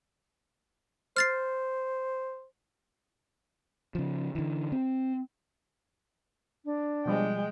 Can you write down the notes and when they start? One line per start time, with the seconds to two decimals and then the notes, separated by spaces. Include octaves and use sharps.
1.17 C5 F6 A6 C7
3.95 C#3 F3
4.35 D3 E3
4.72 C4
6.65 D4
7.06 B2 F3 G3 G#3 G5